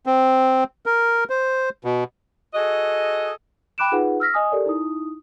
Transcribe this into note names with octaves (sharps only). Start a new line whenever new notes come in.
C4
A#4
C5
B2
F#4 G#4 A4 D#5
G5 B5 D6 F#6 D7 E7
D#4 F4 G#4 B4 F#5
E6 F6 A#6 B6
D#5 G#5 D#6
G4 A4 A#4 D5
D#4 E4 D#6